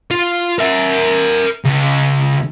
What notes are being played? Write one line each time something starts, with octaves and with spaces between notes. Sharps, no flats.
F4
A#4 E5
C#2